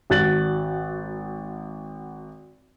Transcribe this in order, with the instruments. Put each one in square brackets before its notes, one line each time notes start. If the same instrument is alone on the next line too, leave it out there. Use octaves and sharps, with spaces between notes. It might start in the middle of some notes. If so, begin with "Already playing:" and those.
[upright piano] G#1 F#4 F#6 A6 F#7